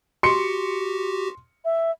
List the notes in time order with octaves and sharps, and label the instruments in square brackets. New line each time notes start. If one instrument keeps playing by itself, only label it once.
[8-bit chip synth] F#4 G4 [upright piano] C6 C#7
[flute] E5